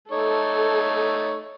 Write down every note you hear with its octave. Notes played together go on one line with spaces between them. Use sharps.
A3 D#4 A4 C#5